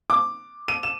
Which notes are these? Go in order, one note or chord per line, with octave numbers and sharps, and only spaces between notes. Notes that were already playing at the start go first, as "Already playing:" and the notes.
D6
D#7
E7